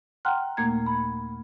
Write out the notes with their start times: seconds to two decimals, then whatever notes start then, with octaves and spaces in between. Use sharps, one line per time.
0.25 F#5 G5 A#5 C6 F6 F#6
0.57 D#2 A#2 A3 A#3 A#5 G#6
0.86 B5